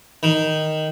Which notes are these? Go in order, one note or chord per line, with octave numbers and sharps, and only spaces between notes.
D#3